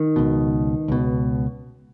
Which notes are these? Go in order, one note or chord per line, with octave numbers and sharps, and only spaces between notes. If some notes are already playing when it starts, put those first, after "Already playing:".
Already playing: D#3
C#2 B2
C#2 B2